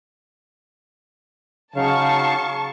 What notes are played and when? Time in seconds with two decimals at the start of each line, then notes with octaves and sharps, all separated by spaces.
1.76 C#3 F#3 C#4 D#4 F5 A5 C#6